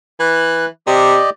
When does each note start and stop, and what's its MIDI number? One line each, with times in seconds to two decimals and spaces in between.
0.20 0.66 52
0.20 0.65 90
0.87 1.18 48
0.87 1.30 67
0.87 1.30 74
0.87 1.30 75